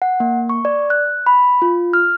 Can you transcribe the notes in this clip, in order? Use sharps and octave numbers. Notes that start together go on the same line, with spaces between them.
F#5
A#3
C#6
D5
F#6
B5
F4
F6